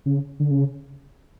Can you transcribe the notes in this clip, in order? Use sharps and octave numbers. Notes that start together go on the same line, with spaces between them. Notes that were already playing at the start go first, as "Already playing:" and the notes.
C#3
D3
C#3